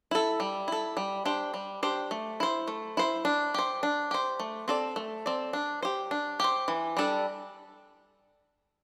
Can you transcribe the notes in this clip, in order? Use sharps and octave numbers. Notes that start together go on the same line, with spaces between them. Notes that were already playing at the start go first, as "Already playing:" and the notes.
E4 A4
G3
E4 A4
G3
D4 G4 C5
G3
D4 G4 C5
A3
E4 C5
A3
E4 C5
D4
G4 C5
D4
G4 C5
A3
C4 A4 D5
A3
C4 A4 D5
D4
G4 C5
D4
G4 C5
E3
G3 D4 A4